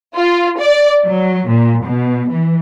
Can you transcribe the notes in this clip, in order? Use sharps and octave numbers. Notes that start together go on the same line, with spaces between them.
F4
D5
F#3
A#2
B2
E3